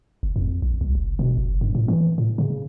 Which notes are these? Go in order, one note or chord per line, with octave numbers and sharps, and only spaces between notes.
F#1
F2
A#1
C2
F1
B2
F#1
G2
A2
E3
A2
C#3